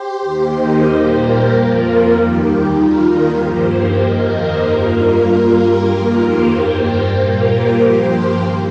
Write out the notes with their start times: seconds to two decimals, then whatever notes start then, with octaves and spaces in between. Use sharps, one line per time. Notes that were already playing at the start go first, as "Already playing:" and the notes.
Already playing: G4 C5
0.21 D#2 D#3 A#3
0.52 A#4 D#5
0.83 A#2 G3 A#3 G4 C5
1.14 F4 A#4
1.46 F2 F3 A#3 F4 A#4
1.78 F4
2.09 D#2 D#3 G3 G4
2.41 G4
2.72 D#2 D#3 G3 F4 A#4
3.03 F4 A#4
3.35 G2 F3 A#3 G4 C5
3.66 G4 C5
3.98 F2 D#3 A#3 A#4 D#5
4.29 G4 C5
4.61 G2 G3 A#3 F4 A#4
5.24 G2 G3 A#3
5.55 G4
5.87 F2 D#3 A#3 F4 A#4
6.18 G4 C5
6.49 G2 G3 A#3 G4 C5
6.81 G4
7.12 A#2 G3 A#3 F4 A#4
7.44 G4 C5
7.75 G2 F3 A#3 G4 C5
8.38 D#3 A#3